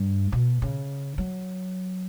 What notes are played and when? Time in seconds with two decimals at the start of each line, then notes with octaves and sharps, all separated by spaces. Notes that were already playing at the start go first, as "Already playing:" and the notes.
Already playing: G2
0.32 B2
0.62 C#3
1.18 F#3